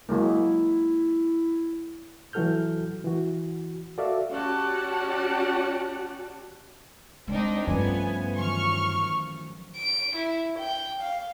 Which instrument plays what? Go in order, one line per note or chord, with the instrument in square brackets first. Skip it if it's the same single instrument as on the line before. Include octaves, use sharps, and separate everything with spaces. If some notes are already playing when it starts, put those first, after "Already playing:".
[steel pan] F#3 G#3 A#3 [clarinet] E4
[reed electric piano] E3 F#3 F#4 A4 F6 G6
E3 F#4
F#4 A4 D5 E5 F5
[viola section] C#4 F#4 G4 D5 F#5 A5
[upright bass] G#3 [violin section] C4 D4 D#4
[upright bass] G2 [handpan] F3 A3 C#4 [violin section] B3 G#5
[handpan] D#3 E3 F#3 [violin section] C#6 F6
[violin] D7
E4
G5
F5